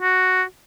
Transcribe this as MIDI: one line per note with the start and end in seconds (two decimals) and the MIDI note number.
0.02 0.43 66